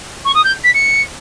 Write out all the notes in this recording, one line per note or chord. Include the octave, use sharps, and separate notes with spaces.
C#6
D#6
G6
B6
C#7